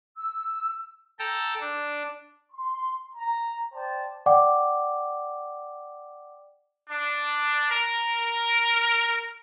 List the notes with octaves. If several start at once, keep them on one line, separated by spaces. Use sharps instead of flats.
E6
A4 G5 A5 A#5
D4
C6
A#5
C5 D5 G5 A5
D5 F#5 G5 D6
D4
A#4